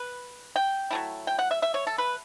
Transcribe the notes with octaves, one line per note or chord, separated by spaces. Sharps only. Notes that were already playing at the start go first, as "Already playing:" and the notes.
Already playing: B4
G5
F#3 A3 E4
G5
F#5
E5
E5
C#5
A4
B4